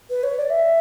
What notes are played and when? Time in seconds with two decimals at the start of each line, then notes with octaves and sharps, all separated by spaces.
0.10 B4
0.23 C#5
0.37 D5
0.50 E5